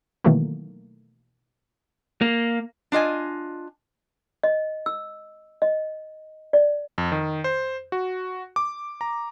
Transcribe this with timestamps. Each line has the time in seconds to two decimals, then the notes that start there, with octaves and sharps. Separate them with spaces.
0.25 B2 D#3 E3 F#3 A3 A#3
2.21 A#3
2.92 D4 F4 D#5 G#5
4.43 D#5
4.86 E6
5.62 D#5
6.53 D5
6.98 F2
7.12 D#3
7.44 C5
7.92 F#4
8.56 D6
9.01 A#5